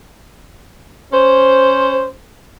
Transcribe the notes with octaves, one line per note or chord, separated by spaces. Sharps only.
C#4 C5